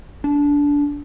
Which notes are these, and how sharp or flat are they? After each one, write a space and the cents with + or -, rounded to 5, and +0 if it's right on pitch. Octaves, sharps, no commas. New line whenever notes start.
D4 -20